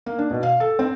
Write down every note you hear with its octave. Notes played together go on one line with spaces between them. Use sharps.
A#3
D4
B2
F5
A4
C4